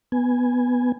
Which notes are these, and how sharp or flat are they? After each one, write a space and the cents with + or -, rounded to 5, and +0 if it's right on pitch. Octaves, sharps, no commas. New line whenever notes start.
B3 +0 G#5 +0